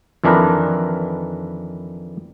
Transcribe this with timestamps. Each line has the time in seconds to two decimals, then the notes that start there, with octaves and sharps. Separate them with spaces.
0.24 F2 D#3 E3 D4 A#4 B4